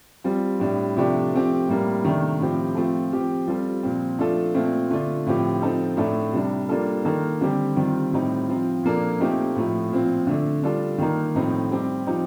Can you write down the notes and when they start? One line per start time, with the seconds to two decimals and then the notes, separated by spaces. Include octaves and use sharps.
0.24 G3 C4 F4
0.60 A2 G3 D4
0.96 C3 F3 A3 D4 G4
1.32 F3 A3 C4 G4
1.68 A2 G3 A#3
2.04 C3 D#3 A3 D4
2.39 A2 F3 C4 G4
2.75 F3 A3 C4 F4 A4
3.12 F3 C4 G4
3.47 G3 C4 F4 A4
3.83 A#2 F3 C4
4.19 F3 A3 D4 F4 A4
4.54 A#2 A3 C4 F4
4.91 D3 A3 D4 F4
5.26 A2 F3 C4 G4
5.62 F3 C4 D#4 A4
5.97 A2 A3 D4 A4
6.33 C3 G3 D4
6.69 G3 A#3 D4 F4 A4
7.05 D#3 A#3 D#4 A4
7.41 D3 G3 C4 G4
7.76 D#3 G3 C4 F4
8.12 A2 G3 C4 D#4
8.48 F3 C4 F4
8.83 A#2 F3 A#3 D4 A4
9.20 A#2 A3 C4 D#4 G4
9.56 A2 F3 A3
9.92 A#2 F3 C4
10.27 D3 A3 D4
10.63 G3 D4 F4 A4
10.98 D#3 A#3 D#4
11.35 A2 F3 A3 C4 D#4
11.71 G3 C4 G4
12.06 F3 C4 D#4 G4